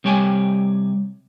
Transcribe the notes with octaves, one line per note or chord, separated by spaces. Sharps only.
C3 G3 C#5 G5 G#5